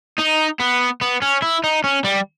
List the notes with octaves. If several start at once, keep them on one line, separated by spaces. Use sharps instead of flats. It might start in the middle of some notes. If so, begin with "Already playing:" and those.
D#4
B3
B3
C#4
E4
D#4
C#4
G3